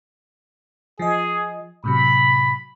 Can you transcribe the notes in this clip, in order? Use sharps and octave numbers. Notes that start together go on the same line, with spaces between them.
F3 G#4 D#5
A2 C3 F#3 B5